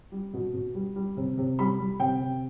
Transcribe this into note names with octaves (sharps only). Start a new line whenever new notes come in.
G3
B2
B2
G3
G3
C3
C3
G3 B5
G3
C3 G5
C3